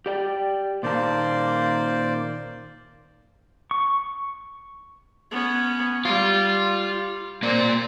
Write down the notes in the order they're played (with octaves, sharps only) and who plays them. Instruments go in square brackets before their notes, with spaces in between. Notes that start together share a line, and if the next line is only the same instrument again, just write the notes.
[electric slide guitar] G4 D5 G5
[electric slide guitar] A#2 D#3 A5 [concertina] A#3 C5 D5
[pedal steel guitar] C#6
[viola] B3 C#4
[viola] G3 [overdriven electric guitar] F4
[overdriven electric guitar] A#3 D5 [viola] C4 C5